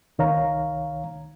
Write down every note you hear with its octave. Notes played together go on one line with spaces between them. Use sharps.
C2 D#3 C#5 F5 A#5